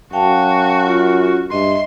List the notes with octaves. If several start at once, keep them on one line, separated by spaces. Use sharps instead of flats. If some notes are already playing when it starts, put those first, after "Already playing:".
F#2 F#4 F5 G5 A5
F4
G2 D#5 E5 C6